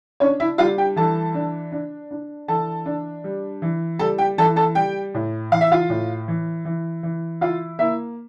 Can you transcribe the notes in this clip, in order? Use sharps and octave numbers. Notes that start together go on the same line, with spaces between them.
C#4 D4 C#5
E4 E5
G3 F4 F5
G4 G5
E3 A4 A5
D4
D4
D4
E3 A4 A5
D4
G3
E3
G3 A4 A5
G4 G5
E3 A4 A5
A4 A5
G3 G4 G5
A2
E3 F5
E5
F4 F5
A2
E3
E3
E3
E4 F4 F5
A#3 E4 E5